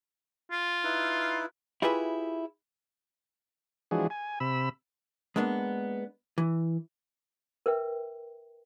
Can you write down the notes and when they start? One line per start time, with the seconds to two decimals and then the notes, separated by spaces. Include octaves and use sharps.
0.51 F4
0.84 D#4 E4 B4
1.82 E4 F4 G4 G#4 B4 E5
3.91 E3 F3 G#3 D4 F#4 G#4
4.10 G#5
4.40 C3 B5 E6
5.36 G#3 A#3 B3 D4
6.38 E3
7.66 A#4 B4 E5 G5